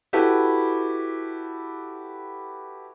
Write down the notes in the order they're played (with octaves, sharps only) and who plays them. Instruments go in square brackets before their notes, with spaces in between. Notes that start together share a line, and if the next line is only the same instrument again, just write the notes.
[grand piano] E4 F#4 G4 A4 B4